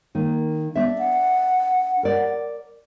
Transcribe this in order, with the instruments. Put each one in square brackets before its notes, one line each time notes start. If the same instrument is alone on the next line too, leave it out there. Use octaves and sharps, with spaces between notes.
[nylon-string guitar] D#3 A#3
[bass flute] B3 [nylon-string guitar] D4 E5
[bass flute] F#5
[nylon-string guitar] A#4 D5